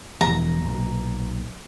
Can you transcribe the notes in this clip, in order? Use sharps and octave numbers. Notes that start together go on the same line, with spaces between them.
E1 E3 F3 A#5
B1 A#2